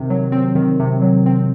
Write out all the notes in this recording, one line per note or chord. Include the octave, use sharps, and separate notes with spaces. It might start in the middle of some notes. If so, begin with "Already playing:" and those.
Already playing: C3 D#3 C4
F#3
C4
D#3
C3
F#3
C4